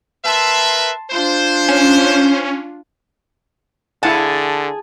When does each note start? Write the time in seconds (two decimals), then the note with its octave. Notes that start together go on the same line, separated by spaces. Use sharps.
0.24 A#4 B4 E5 A5 C6
1.11 D4 F4 C5
1.68 C#4
4.03 D3 E4 G#4 F5 F#5 A5